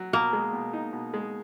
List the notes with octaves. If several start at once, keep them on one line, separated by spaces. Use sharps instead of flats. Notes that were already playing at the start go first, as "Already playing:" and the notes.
Already playing: F#3
B2 A#3
G#3
B2
D#4
B2
G#3